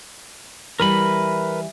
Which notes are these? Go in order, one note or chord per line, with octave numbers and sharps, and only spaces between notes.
E3 G3 E4 A#4 B4 B5